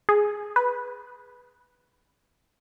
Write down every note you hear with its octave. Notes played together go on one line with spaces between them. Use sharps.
G#4
B4